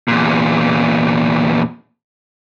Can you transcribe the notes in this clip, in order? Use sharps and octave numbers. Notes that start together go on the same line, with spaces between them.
E2 A#2